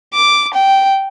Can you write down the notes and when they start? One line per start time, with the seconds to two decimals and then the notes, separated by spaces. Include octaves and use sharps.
0.13 D6
0.53 G5